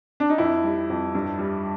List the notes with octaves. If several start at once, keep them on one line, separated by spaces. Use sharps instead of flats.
D4
D#4
F2 E4
G3
F2
G2
G3